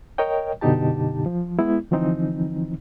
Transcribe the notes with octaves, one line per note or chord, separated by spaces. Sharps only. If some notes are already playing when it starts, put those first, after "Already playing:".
A#4 C#5 D#5 G5
F#2 B2 D3 D#4 G4 A5
F3
G#3 B3 E4
D3 E3 F3 C4 D#4